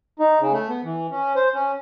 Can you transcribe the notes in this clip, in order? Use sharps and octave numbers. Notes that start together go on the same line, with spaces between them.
D#4
C#3
A3
B3
E3
C#4
C5
C#4